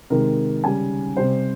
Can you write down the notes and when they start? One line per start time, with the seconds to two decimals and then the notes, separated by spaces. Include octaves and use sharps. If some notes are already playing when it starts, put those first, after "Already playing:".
0.10 C3 D#3 G#3 A#4
0.63 C#3 G3 G#5
1.17 C3 G3 C5